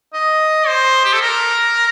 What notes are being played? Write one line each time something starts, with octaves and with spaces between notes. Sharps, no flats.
D#5
C5
G4
A4
A#4